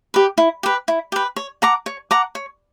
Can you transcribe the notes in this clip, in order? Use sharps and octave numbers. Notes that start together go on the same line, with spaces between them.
G4 B4
E4
G4 B4
E4
G4 B4
C#5
F#5 A#5 D6
C#5
F#5 A#5 D6
C#5